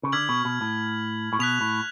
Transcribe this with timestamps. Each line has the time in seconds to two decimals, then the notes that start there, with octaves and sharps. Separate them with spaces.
0.03 C#3
0.12 D3 F6 G#6 B6 F#7
0.29 B2
0.45 B2
0.61 A2
1.33 A2
1.39 B2 F#6 B6 F7
1.61 A2